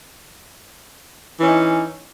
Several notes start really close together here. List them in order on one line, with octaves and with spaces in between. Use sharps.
E3 C#4 D#4